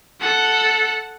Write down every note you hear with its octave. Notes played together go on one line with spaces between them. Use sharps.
A4 F#5